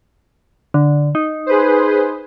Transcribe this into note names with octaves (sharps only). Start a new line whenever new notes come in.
D3
D#4
G#4 B4 C5